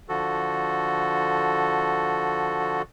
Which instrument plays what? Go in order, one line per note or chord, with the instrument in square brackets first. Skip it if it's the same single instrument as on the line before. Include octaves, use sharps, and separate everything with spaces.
[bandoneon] D3 F3 F#4 A4